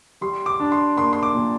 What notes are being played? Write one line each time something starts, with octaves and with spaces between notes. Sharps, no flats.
G3 C6
D6
D4
C6
A#3 C6
C6
D6
A#2